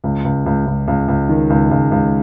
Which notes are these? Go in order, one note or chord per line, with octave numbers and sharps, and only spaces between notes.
C#2
C#2
C#2
C#2
C#2
C#2
D#3
C#2
C#2
C#2